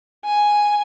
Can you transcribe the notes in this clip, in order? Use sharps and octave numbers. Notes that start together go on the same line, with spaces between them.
G#5